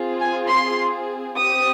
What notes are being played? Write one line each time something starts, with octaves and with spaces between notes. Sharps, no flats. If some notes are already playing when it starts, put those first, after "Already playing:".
Already playing: C4 F4 G#4
G#5
C6
C4 G4 D#6